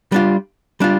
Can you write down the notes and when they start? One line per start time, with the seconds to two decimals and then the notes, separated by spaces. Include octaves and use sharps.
0.12 G3 D4 F4
0.80 G3 D4 F4